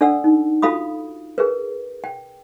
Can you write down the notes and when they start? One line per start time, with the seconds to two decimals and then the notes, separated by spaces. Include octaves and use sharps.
0.01 D4 A4 D5 F#5 E6
0.24 D#4
0.62 F4 F#4 A4 F5 B5 D#6
1.38 G#4 A#4 B4
2.04 G5